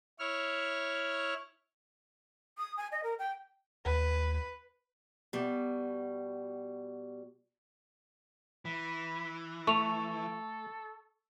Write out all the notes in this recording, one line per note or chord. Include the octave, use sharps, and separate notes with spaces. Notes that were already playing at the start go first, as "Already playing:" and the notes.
E4 C#5 F6
D#6
G#5
D#5
A#4
G5
D#2 B4
B2 G3
E3 B5
A3 A4 C#6 F7